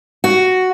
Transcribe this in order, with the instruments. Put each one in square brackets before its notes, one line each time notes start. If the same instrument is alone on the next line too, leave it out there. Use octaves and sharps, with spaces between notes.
[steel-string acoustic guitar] F#4